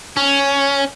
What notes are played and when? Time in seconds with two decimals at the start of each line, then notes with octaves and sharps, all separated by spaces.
0.17 C#4